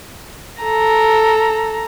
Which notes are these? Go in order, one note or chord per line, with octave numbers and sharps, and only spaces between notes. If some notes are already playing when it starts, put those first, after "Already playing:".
A4 A#5